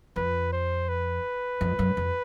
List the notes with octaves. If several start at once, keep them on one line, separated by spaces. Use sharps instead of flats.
F2 B4
C5
B4
F2
F#2
F2